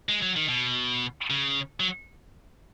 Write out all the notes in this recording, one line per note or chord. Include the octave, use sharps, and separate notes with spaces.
G#3
F#3
D#3
B2
C#3
F#3